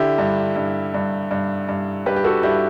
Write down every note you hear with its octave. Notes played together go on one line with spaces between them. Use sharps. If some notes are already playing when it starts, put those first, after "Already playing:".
Already playing: D3 E4 G4
G2
G2
G2
G2
G2
G2 G4 B4
G4
F#4 A4
G2 E4 G4